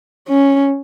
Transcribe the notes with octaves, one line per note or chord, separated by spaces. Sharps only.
C#4